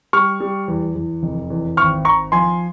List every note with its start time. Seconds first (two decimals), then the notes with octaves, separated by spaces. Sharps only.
0.13 G3 C#6 F6
0.40 G3
0.68 E2
0.95 E2
1.23 F1
1.50 E2
1.77 G#1 C#6 F6
2.05 G#1 A#5 C#6
2.32 F3 G#5 C6